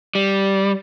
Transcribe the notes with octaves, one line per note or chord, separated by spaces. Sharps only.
G3